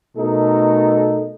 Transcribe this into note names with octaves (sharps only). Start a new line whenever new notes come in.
B2 A3 D#4 A4 A#4